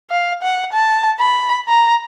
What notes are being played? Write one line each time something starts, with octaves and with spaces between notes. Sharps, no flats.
F5
F#5
A5
B5
A#5